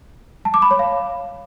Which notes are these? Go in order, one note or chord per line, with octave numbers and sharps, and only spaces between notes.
A5
D6
B5
C#5
F5